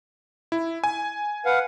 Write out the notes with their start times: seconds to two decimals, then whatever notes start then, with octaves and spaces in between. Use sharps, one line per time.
0.52 E4
0.84 G#5
1.46 B4 F5 F#5